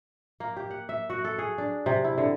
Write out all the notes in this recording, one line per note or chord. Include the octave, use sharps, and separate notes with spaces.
A#3
G4
F#5
E5
F#4
A4
G#4
D4
C3
E4
D3